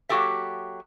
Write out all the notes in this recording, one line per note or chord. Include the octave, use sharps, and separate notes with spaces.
F#3 A#3 F#4 G4 A4 E5